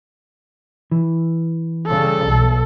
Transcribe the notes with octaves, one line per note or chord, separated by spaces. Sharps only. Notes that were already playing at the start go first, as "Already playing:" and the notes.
E3
C#3 G3 A4
B1